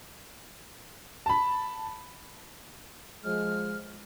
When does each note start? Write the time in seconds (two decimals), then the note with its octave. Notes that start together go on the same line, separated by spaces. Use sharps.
1.26 A5 B5
3.24 F3 G#3 F6